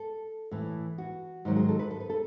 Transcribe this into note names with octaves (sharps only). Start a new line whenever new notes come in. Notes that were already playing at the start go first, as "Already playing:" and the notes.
Already playing: A4
A2 E3
F#4
G#2 D#3 F#3
G#4
A4
B4
A4
B4
A4